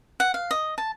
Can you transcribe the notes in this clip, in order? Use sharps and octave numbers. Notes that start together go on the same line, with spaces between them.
F#5
F5
D#5
A5